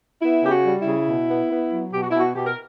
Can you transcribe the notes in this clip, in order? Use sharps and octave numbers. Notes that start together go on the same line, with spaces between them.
B3 E4
C#3 G4
F#4
G3
E4
C#3
B2
B3
B3
F#3
B2 G4
F#4
B2 E4
F#4
B2 G4
A#4